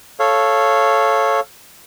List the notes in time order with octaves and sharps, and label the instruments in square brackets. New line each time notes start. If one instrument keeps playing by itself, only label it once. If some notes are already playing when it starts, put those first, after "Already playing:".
[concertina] A4 C#5 F5